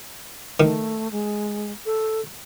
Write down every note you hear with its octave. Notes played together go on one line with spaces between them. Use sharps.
D#3 A3
G#3
A4